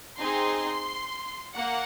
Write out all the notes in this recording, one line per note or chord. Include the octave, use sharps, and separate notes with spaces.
C4 D#4 G#4 C6
A#3 F#5